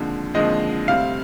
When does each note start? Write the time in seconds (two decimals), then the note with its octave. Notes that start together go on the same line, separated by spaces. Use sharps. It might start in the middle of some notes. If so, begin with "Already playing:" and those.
Already playing: D#2 D3 F3 G#3 C4
0.34 D#2 D3 F3 G#3 C4 D#5
0.87 D2 C3 G3 C4 F5